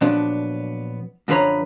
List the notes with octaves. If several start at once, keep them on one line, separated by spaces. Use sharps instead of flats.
A#2 F3 F#3 B3 D4
F#2 D3 F3 B4 C#5 A#5